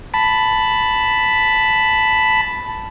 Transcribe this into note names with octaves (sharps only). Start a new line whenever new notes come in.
A5 B5